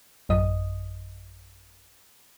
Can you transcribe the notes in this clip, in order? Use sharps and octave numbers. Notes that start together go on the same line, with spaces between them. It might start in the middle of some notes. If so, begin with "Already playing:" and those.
A1 F#2 D#5 D#6